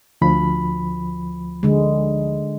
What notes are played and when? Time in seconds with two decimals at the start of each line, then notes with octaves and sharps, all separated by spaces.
0.21 D2 F3 B5
1.63 D3 G#3